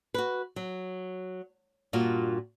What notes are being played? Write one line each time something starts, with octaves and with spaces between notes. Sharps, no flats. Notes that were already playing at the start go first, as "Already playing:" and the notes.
F#4 B4
F#3
G2 A#2 F4 F#4